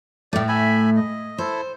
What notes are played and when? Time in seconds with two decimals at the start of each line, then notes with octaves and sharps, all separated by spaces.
0.33 A2 A3 D5
0.48 E5 G#5 B5
0.96 D#5
1.38 E4 A4 C5